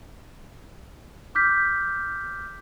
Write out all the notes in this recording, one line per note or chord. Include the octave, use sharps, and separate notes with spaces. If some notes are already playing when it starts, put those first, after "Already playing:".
D6 F6 G6 B6